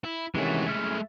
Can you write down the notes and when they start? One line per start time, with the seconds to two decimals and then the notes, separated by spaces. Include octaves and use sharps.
0.04 E4
0.35 C3 D#3 E3 G#3 A3 C#4 F#4
0.66 C#4 E4 E5 F6